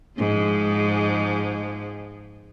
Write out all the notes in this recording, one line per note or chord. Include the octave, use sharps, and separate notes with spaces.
G#2 F3 G#3